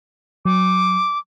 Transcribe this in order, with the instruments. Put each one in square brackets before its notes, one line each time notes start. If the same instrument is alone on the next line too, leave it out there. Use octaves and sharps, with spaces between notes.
[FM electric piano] F#3 [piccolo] D6